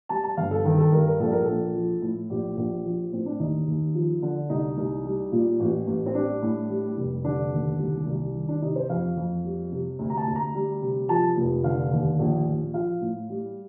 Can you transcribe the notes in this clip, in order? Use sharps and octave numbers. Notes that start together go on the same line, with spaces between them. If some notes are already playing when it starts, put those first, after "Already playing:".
G3 A5
A5
G1 F5
A4
D#3 A4
A4
G2 A#4
A#4
A#1 A4
A#4
A#1 A4
F3
A2
A#1 G4
A#1
F3
A2 C4
D4
D#2 D#4
D#2
F3
D3
C2 D#4
C2
G3
A#2
A1
A1
C4
G3 D4
A2
G3
F1
D3 D4
D#2
C2
C2
D#3
D4
C3 D#4
C5
F2 F5
F2
G3
C3
D2
A#5
A5
D2
A#5
G3
C3
F3 A5
F1
D3 F5
D#2
A#1
A#1
F3 F5
A2
G3